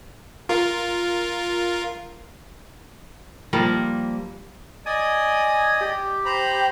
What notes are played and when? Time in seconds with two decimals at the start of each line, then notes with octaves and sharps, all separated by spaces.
0.49 F4 A#4
3.53 F3 G3 A#3
4.86 D5 D#5 G#5 D#6
5.81 G4
6.25 C5 A#5 B5